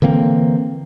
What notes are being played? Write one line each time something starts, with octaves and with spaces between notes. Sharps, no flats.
D3 E3 A#3 C4